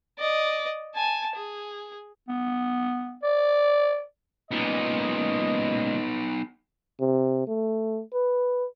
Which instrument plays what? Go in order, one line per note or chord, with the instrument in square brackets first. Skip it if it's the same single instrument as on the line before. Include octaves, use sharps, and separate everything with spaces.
[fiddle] D5 D#5
G#5 A5
G#4
[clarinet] B3
D5
[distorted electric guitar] C#2 A#2 [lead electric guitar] B3 D#4 [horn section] D#5
[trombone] C3
A3
B4